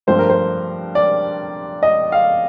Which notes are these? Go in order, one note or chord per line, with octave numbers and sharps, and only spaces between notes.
G2 F3 A3 C5
A#4
C5
D5
D#5
F5